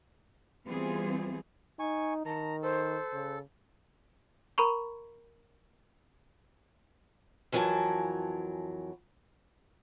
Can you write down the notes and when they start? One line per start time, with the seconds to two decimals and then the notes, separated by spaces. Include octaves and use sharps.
0.66 E3 G3 B3 C4 F4 G#4
1.79 D#4 G#5 C#6
2.26 D#3 A5 A#5
2.63 A4 C5
3.13 C#3
4.58 A#4 A#5 B5 C#6
7.52 F2 E3 F#3 A#4 G#5 A5